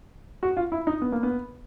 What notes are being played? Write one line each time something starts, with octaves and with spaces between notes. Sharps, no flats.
F#4
F4
E4
D#4
B3
A#3
B3